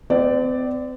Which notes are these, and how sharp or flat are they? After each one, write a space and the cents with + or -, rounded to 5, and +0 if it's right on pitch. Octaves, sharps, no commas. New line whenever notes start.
C4 -40 D5 +0